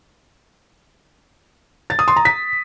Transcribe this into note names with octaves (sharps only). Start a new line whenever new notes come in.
A6
D#6
C6
A#5
B6